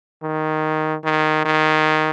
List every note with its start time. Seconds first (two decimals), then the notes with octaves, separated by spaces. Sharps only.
0.23 D#3
1.04 D#3
1.45 D#3